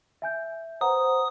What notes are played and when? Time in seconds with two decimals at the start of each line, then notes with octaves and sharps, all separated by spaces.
0.22 E5 G#5 G6
0.81 B4 C5 F#5 A#5 D#6